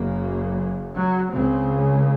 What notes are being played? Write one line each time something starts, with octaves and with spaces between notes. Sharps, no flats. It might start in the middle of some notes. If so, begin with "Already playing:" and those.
Already playing: F#1 F#2 C#3 A#3
F#3
C#2 C#3 C4